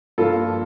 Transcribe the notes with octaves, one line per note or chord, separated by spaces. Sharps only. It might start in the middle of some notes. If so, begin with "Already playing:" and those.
G2 F3 A#3 F4 A4